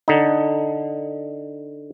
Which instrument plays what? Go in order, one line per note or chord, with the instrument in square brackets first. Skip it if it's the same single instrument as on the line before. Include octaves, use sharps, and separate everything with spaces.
[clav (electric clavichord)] D3 D#4